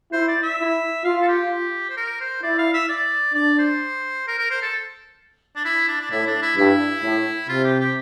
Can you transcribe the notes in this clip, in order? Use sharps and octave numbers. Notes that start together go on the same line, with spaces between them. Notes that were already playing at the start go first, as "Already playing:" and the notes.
E4 C5
D5
E5
E4
F4 F5
A4
G4
C5
A#4
C5
E4 D5
F5
E5
D5
D4 D5
C5
A#4
A#4
C5
A4
D4
E4
D4
D4
A2 E4
D4
E4
G2 E4
A2
C3 F4
G4
G4